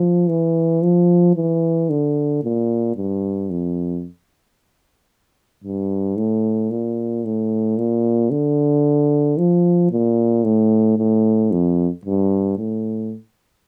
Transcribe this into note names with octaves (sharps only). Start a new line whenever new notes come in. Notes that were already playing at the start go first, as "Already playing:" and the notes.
Already playing: F3
E3
F3
E3
D3
A#2
G2
F2
G2
A2
A#2
A2
A#2
D3
F3
A#2
A2
A2
F2
G2
A2